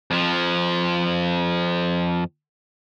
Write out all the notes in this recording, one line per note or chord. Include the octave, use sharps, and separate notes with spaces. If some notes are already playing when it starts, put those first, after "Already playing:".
F2 F3